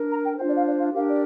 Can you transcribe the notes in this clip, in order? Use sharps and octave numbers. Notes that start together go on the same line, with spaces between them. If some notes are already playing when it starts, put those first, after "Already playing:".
Already playing: D4 A#4
A#5
G5
D4 F4 C5 G5
D5
F5
D5
F5
D4 G4 A#4 F5
D5